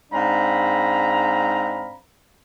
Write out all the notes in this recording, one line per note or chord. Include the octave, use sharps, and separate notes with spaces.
G#2 C4 D4 F5 A#5 B5